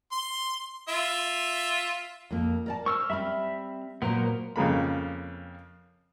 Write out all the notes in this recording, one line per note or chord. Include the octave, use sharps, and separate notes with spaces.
C6
F4 E5
F2 A#3
A#4 D5 A5
C5 C#6 E6 F6
G3 C4 E5 B5 F6
A#2 F#3 A#3 B3 A#4 C5
F2 C#3 A#3 B5